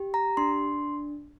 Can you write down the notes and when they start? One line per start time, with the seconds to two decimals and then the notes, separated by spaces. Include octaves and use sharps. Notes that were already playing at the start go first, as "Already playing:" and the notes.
Already playing: G4
0.14 A#5
0.37 D4 C6